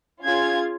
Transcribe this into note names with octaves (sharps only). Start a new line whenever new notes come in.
C#4 F4 G#4 G#6